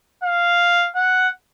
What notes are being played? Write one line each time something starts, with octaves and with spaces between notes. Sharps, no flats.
F5
F#5